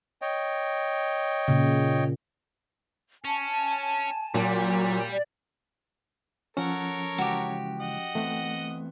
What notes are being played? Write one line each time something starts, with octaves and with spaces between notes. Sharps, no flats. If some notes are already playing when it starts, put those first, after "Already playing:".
C#5 D#5 G5
A#2 C#3
C#4 G#5 A5
A#2 F#3 G3
D5
F3 C#4 A4 A#4 C#5 F#5
C#3 E3 G#3 F#4 G4
D#5 F#5
E3 A3 B3 C4